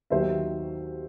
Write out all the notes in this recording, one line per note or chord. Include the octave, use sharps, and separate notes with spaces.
D#2 D#3 F#3 C5 E5